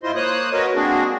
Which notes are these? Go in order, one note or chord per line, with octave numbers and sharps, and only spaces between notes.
G#2 E4 F4 C5 D#5 C6
A#3 C5 C#5 D#6 F#6
F#4 A#4 B4 C#5 D#5
G#3 A#3 C4 D4 F#4 G#4